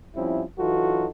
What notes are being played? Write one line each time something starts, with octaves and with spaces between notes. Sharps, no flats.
F3 G3 C4 C#4 E4
E3 F#3 D#4 F4 F#4 A4